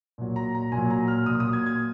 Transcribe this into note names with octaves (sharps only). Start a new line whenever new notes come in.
A#2 F#3
A#5
A#5
A#2 G#5
F#3
A#5
F6
A#2 F#3 D#6
D#6
G#6
G#6